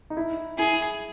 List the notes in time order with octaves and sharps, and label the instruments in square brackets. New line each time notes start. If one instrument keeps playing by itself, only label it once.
[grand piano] D#4
E4
[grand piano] E4 [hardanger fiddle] G#4